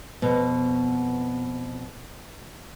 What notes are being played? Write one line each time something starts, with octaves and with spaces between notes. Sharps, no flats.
F2 B2